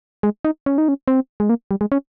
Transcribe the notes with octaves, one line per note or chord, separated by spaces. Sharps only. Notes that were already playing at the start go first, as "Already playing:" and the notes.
G#3
D#4
C#4
D#4
C#4
C4
G#3
A#3
G3
G#3
C#4